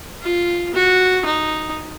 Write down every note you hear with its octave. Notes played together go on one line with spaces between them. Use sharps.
F4
F#4
D#4